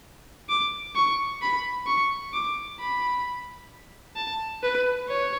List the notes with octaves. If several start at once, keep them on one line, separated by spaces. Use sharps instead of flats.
D6
C#6
B5
C#6
D6
B5
A5
B4
C#5